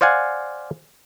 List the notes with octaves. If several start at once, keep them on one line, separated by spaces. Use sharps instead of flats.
C5 D5 F5 F#5 G#5